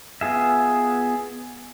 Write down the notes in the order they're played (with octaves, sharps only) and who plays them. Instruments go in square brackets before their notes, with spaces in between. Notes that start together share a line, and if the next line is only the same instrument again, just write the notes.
[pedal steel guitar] B3 F4 G#4 E5